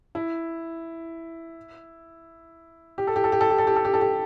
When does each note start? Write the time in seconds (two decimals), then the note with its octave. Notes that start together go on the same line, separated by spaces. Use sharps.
0.15 E4
2.98 G4
3.07 A4
3.16 G4
3.24 A4
3.32 G4
3.41 A4
3.50 G4
3.58 A4
3.67 G4
3.76 A4
3.85 G4
3.94 A4
4.01 G4